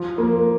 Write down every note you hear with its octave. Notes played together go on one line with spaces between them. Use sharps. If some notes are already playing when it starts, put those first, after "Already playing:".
Already playing: F3 F4
A#3 F4